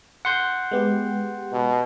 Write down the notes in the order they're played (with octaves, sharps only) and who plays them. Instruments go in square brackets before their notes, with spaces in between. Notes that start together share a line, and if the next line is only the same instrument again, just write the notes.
[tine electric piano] F#5 C6 G6
[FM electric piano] G#3 B3 G4
[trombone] B2